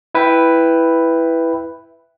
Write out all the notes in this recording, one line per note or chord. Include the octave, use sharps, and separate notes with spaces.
E4 B4 E5 G5